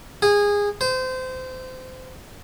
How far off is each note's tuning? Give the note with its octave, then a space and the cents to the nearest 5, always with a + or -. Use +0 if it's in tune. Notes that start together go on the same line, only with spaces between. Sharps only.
G#4 -20
C5 -25